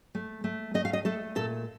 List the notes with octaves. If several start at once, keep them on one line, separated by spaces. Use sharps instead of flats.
A3
A3
A3 D#5
F5
D#5
A3 A4
A#2 A4